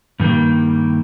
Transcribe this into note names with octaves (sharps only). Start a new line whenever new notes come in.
G2 D#3 G3 A#3